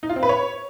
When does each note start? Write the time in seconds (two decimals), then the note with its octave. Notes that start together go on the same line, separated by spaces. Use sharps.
0.03 D#4
0.09 F4
0.16 C4
0.23 B4
0.29 C#5